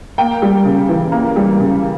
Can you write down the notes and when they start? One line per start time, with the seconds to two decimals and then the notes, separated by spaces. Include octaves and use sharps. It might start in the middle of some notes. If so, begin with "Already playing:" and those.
0.18 A#3 G5
0.42 G3
0.65 C#3
0.89 E3
1.12 A#3
1.36 G3
1.60 C#3